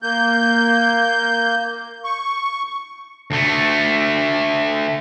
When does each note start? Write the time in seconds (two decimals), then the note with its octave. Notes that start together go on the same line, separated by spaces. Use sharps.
0.02 A#3 G6
2.04 C#6
3.31 D2 A3